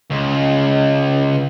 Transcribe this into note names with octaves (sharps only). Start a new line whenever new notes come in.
C#2